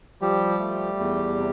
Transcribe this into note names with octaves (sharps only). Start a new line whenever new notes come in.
F3 G3 G4
A3
E2
C3